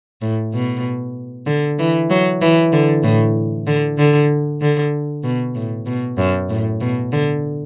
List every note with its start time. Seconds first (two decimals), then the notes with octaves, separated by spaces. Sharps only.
0.22 A2
0.53 B2
1.46 D3
1.79 E3
2.10 F#3
2.42 E3
2.72 D3
3.03 A2
3.67 D3
3.98 D3
4.61 D3
5.24 B2
5.55 A2
5.86 B2
6.18 F#2
6.49 A2
6.81 B2
7.12 D3